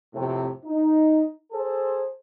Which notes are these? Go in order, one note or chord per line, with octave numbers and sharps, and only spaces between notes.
F2 A2 C3
D#4
G#4 A4 C5